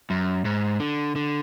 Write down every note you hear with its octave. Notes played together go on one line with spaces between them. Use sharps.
F#2
G#2
D3
D3